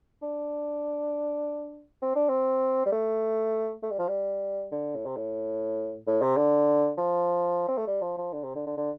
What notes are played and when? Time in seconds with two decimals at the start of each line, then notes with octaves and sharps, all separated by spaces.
0.22 D4
2.02 C4
2.15 D4
2.29 C4
2.85 G3
2.92 A3
3.83 A3
3.91 G3
3.99 F3
4.08 G3
4.72 D3
4.95 A2
5.06 C3
5.17 A2
6.07 A2
6.22 C3
6.37 D3
6.97 F3
7.68 C4
7.78 A3
7.87 G3
8.02 F3
8.18 F3
8.33 D3
8.43 C3
8.55 D3
8.66 D3
8.77 D3